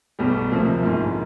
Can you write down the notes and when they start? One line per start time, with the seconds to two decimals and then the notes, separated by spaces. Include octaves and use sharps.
0.19 B1 B2 G3
0.51 D2 C3 F3 A#3
0.83 A#1 G#2 D#3